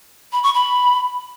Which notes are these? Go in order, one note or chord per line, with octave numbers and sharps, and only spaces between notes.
B5
C#6
B5